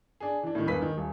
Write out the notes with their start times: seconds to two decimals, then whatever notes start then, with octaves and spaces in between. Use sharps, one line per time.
0.20 D4 G#4
0.43 E3 D4
0.55 A2 D#3
0.66 E1 G2 A#3 B4 B6
0.82 D#3
0.97 D#1